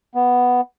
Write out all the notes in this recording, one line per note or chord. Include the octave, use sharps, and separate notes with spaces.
B3